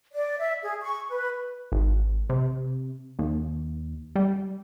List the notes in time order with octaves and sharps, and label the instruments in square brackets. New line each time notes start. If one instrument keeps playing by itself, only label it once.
[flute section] D5
E5
G#4
C#6
B4
[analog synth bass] G#1
C3
D#2
G3